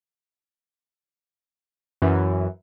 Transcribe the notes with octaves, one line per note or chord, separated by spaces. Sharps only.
F#2 E3